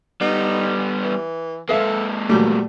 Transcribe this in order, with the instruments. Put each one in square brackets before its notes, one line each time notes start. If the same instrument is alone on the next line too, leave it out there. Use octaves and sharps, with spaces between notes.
[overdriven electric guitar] G3 B3 [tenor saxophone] D#4
[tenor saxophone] E3
[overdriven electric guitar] G#3 A#3 [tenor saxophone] A4 [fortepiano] B4 E5 F5
[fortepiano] A#2 F#3 A3 [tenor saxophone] G3